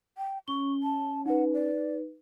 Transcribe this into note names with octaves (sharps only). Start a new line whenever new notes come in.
G5
C#4 C#6 G7
A5
D#4 B4 F#5
D5